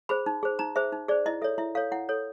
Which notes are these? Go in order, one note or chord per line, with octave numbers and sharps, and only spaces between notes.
G#4 C5 B5
D#4
G#4 C5
D#4 A#5
G#4 C5 E5
D#4
G#4 C5 D5
E4 D#5
A4 C#5 E5
E4 E5
A4 C#5 F5
E4 F#5
A4 C#5